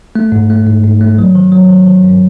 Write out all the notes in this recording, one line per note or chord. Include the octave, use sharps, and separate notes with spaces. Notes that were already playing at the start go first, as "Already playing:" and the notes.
A3
G#2
A3
G#2
G#2
A3
F#3
D#3
F#3
D#3
D#3
G2